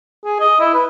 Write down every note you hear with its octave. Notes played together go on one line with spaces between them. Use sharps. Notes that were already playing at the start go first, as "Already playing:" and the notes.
G#4
D#5
E4
B4